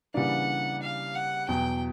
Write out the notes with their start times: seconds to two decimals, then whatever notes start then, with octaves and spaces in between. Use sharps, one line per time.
0.14 C#3 E3 G3 A#3 D4 F#5
0.82 F5
1.15 F#5
1.48 E2 B2 F#3 G5